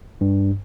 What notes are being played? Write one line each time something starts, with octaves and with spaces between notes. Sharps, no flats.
G2